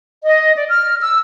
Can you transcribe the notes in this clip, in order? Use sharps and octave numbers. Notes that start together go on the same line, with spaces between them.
D#5
D5
F6
E6